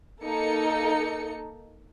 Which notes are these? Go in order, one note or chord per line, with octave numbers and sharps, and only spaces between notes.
A#3 D#4 A4 C#7